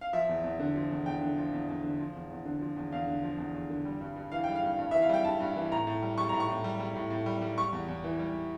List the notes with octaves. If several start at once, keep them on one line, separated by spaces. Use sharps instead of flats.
F5
F3 E5
E2
E2
D3
F3
E2
E2 G5
D3
F3
E2
E2
D3
F3
E2
E2
D3
F3
E2
E2 F5
D3
F3
E2
E2
D3
G3
G2
G2
E3 F5
G3 G5
F5
G2
G2
E3 E5
F5
G3 G5
G2 A5
G2
E3
A2 A#5
A2
G3
G3 C#6
A2 A#5
C#6
A2
G3
G3
A2
A2
G3
G3
G3 C#6
E2
E2
E3
G3